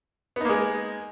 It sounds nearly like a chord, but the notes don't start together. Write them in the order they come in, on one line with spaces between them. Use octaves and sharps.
B3 D#4 A#3 G#3